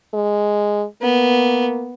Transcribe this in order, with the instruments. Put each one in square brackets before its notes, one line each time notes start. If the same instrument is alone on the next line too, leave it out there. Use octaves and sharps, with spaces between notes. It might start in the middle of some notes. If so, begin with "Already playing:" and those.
[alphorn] G#3
[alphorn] A#3 [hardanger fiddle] B3